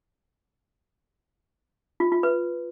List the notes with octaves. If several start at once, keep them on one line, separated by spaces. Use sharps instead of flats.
F4
F4
B4